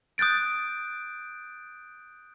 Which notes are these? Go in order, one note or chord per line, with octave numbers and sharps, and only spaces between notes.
D#6 F#6 G6 A6 D7